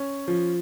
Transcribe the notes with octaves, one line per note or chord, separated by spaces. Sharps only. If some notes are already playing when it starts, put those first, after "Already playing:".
Already playing: C#4
F3